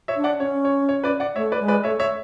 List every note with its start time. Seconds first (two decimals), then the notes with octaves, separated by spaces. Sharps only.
0.08 C#5 E5
0.16 D4
0.24 D5 F#5
0.40 C#4 C#5
0.65 C#5
0.89 C#5
1.04 B4 D5
1.20 D5 F#5
1.36 A3 C#5 E5
1.52 B4 D5
1.60 G#3
1.68 B4 D5
1.84 A3 C#5 E5
2.00 C#5 E5